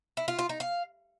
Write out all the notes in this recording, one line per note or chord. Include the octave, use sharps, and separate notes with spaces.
E4
F4
F4
D#4
F5